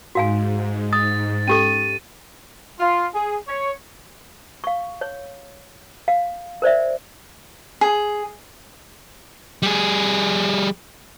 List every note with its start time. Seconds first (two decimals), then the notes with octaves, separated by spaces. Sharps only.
0.15 G#2 F#4 F5 G#5
0.93 D#6 A6
1.48 C#4 G4 A4 D#7
2.80 F4
3.14 G#4
3.48 C#5
4.64 F5 C#6
5.01 C#5
6.08 F5
6.62 A#4 C5 D5 E5
7.81 G#4
9.62 G3 G#4